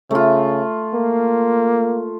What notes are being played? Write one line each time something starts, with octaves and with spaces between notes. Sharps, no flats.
C#3 A3 F4
A#3